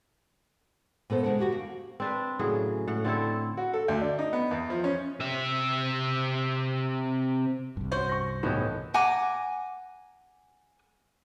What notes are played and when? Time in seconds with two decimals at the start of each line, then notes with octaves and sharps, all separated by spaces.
1.10 A#2 B3 A4 C5
1.23 C#3 G#3 D4 F#5
1.39 E2 F#4 G4 F#5
1.52 A#3
2.00 C4 D4 B4
2.39 A2 C#3 F#3 G#4
2.88 A2 F#5
3.04 D3 C4 E4 A4
3.57 F#4
3.74 A4
3.88 D2
4.01 D4
4.19 D#4
4.33 B3
4.51 E2
4.70 F3
4.84 C#4
5.20 C3 E5
7.77 C2 G2
7.92 C#4 F#4 C5
8.09 C#6 A#6
8.43 F#1 A2 E3 B3 D#4 G4
8.94 F#5 G#5 A#5 D6